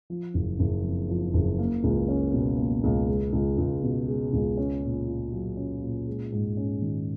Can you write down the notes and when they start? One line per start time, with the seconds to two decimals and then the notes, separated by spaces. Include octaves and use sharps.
0.10 F3
0.34 F#1
0.59 F#1
0.84 F2
1.09 F3
1.34 F#1
1.59 A#3
1.84 C#2
2.08 C#4
2.34 B2
2.58 A#3
2.84 C#2
3.08 G#3
3.33 C#2
3.58 C#2
3.83 B2
4.08 G#3
4.33 C#2
4.57 C#4
4.83 A#2
5.07 F4
5.33 F#3
5.57 C#4
5.82 A#2
6.07 G#3
6.32 G#2
6.57 C#4
6.82 D#3